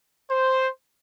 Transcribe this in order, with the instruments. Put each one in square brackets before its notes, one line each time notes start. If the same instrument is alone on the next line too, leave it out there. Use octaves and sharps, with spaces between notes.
[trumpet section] C5